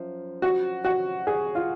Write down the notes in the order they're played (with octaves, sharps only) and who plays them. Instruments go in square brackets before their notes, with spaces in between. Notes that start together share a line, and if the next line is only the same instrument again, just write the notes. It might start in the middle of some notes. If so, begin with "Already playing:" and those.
Already playing: [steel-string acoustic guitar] F#2 F3
[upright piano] F#4
F#4
G#4
F4